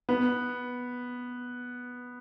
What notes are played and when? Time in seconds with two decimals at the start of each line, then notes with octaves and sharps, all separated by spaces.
0.09 B3